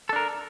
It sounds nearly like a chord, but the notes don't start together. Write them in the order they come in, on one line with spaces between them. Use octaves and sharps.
A4 D4 A#4